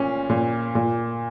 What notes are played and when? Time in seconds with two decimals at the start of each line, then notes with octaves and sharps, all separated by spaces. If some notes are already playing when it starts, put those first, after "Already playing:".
Already playing: A#2 C#4
0.29 A#2
0.75 A#2